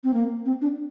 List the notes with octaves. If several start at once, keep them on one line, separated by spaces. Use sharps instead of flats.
C4
A#3
C4
D4